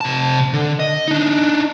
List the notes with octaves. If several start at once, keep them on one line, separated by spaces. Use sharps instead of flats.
C3 A5
D3
D#5
D4 D#4